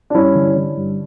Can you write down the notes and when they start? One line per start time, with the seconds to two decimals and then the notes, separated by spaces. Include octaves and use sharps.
0.10 D4
0.15 G2 C#4 E4
0.35 D3
0.56 D3
0.77 G2